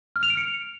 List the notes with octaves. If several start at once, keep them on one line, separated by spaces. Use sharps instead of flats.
F6
F7
D7
C#7